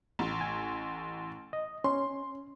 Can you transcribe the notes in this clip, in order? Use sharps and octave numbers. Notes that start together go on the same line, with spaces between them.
A1
G#5
D#5
C#4 C6